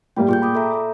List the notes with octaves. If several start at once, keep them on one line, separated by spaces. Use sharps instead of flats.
A2 G3 A#3 G5
A#2 G#4 G5 G6
B5 D6 D#6
A4 E5 A#5